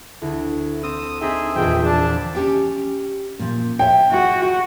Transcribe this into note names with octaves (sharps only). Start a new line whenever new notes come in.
D2 E4
C4 D#6 E6
C4 D#4 G#4 E5 G5
E1 A#1 E2 F3 G5
D4 A5
C#4 G4 G5
A#2 F3
C#5 E5 G5
E4 F#4 G#4